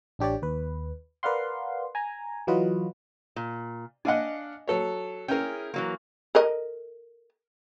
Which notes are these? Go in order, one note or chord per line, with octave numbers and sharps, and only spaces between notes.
A1 D4 G4 C#5 D5
D#2 B4
A#4 B4 D5 F5 F#5 C6
G#5 A#5
E3 F#3 F4 F#4 B4 D#5
A#2
D4 D#5 F5 F#5 G#5
F#3 A4 C#5
C#4 E4 G#4 A#4 G5
E3 F#3 A#3
A4 A#4 D#5